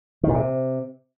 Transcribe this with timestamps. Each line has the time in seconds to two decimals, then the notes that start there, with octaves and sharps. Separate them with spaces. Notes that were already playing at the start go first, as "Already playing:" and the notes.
0.23 D#3
0.29 A#2
0.34 C3